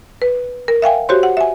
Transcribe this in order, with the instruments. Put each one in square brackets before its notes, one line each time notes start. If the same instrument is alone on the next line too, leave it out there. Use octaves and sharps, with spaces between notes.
[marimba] B4
A#4
E5 F5 G5 G#5
F#4 G4 C5 C#5 C6
F#5
E5 G#5